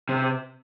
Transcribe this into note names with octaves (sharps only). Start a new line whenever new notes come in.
C3